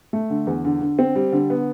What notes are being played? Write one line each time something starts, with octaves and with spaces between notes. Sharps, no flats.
A3
D3
E2
D3
D3
C4
G3
D3
B3